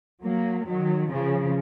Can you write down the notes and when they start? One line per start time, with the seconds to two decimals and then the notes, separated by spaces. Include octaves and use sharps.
0.24 F#3 A#3
0.67 D#3 F#3
1.11 C#3 F3